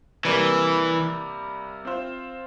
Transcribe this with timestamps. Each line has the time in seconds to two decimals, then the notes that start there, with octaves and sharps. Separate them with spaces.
0.25 C3 E3 G3 A#3
1.85 C4 F4 C5